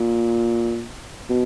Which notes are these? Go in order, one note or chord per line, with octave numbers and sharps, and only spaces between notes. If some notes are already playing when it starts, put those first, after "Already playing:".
Already playing: A#2
B2